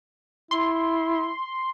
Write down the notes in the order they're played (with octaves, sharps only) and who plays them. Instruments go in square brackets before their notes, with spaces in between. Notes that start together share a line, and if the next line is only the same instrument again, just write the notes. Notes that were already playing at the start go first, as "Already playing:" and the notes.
[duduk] E4 [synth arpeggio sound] C6